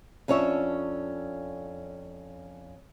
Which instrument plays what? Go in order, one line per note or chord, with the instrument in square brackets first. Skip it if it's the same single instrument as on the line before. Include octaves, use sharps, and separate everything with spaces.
[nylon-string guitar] F2 C#4 D4 C#5 E5